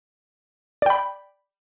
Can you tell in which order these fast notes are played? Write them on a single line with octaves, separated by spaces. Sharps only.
D5 G5 B5